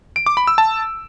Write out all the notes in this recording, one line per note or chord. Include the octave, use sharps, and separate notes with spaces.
D7
D6
B5
E6
A5